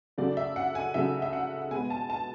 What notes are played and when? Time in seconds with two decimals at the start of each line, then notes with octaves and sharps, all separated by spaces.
0.18 C#3 F#3 A3 D5
0.37 E5
0.56 F#5
0.75 G#5
0.94 C#3 F#3 A3 E5
1.22 E5
1.33 F#5
1.71 B2 G#3 B3 G#5
1.90 A5
2.10 A5